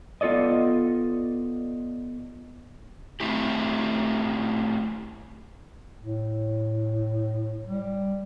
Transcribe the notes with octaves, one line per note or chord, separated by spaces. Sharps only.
B3 F4 A4 D5 D#5
A3 C4 E4 G4
A2
G3